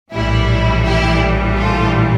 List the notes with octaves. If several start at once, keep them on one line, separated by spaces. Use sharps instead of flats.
A#1 A2 E3 G3 E4
E4 G4
F4 A4